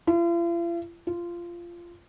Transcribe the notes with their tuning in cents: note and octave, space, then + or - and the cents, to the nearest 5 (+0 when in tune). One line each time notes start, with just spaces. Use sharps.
F4 -45
F4 -15